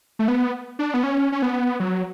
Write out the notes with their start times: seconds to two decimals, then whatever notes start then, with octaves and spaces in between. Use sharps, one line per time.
0.19 A3
0.28 B3
0.79 D4
0.94 B3
1.04 C#4
1.32 C#4
1.42 B3
1.80 F#3